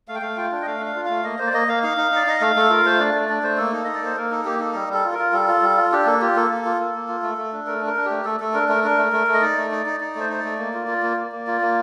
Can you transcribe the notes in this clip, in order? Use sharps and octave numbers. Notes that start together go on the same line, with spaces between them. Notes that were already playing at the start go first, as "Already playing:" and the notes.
A3 F5
G5
A3 F5
F4 G5
D4 G5
D#5
A3 F5
D4
F5
F4
A3 F5
A#3 D#5
A#3 C5
D5
A#3 D#5
A#3 F5
D#4 F5
D#4
D#4 D5
D#4 D#5
A3 F5
A3 A4
F4 A#4
A3 C5
D4 D5
A3 D5
D4 D5
A3 C5
A#3 A4
D#4
D#4 D#5
D5
A#3 C5
A#3 A#4
D#4 A4
A#3 G4
D#4 A4
G3
G3
A4
F4
A#4
F4
G3 A4
F4
G3
F4
D4 G4
A#3 A4
F4 G4
A#3 A4
A#3
F4
A#3
A#3
F4
A3
A3
D4
A3 A#4
D4 A#4
D4
G4
A3
A3 A4
A3 A4
D4 A#4
A3 A#4
D4 A#4
A3
A3
A3
D#5
D#4 D5
A3
D#4
D#4
D#4 D5
A3 C5
D#4 C5
A3 D5
A#3
F4
F4
A#3
A#3
A#3
F4
A#3